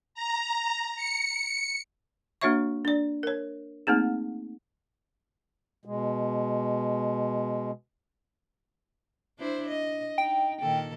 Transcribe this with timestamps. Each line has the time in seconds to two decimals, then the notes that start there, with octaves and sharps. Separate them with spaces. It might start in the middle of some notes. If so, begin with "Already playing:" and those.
0.15 A#5
0.96 C#7
2.41 A#3 D4 F#4 C#5 E5 C#6
2.85 D4 D5
3.23 A#4 C#5
3.87 A3 A#3 C4 D#4 G#4
5.85 B2 G#3
9.38 D4 E4 C5
9.68 D#5
10.18 D#4 G5
10.61 A#2 D#3 A4